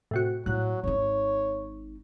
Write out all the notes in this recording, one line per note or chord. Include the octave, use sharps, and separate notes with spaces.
A2 C3 F#4
A2 F#3 A#3 F#6
G#1 D#4 C#5